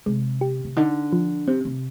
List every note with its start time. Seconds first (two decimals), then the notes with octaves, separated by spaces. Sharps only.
0.06 C3 G#3
0.41 G4
0.64 C3
0.76 D3 D#4
1.13 F3
1.47 C3 C4
1.65 C3